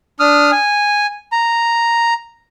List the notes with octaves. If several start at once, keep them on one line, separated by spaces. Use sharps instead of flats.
D4 D#6 F6
G#5
A#5